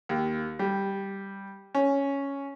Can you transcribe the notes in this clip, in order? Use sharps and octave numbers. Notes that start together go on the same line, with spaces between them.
D#2
G3
C#4